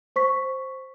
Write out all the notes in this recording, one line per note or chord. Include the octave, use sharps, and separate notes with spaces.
C5 C#6 B6